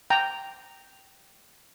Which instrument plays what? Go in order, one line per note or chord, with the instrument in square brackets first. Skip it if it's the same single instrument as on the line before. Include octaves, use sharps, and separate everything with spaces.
[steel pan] G5 A#5